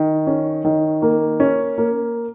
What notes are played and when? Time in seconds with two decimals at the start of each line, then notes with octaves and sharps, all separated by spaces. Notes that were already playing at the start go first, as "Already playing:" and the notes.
Already playing: D#3
0.27 C#4
0.65 D#3
1.02 A#3
1.40 C#4
1.78 A#3